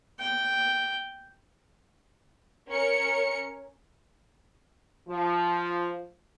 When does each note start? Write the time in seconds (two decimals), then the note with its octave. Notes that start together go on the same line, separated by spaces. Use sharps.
0.20 G5
2.69 C#4 A#4 C#7
5.08 F3